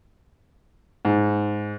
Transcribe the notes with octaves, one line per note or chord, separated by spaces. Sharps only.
G#2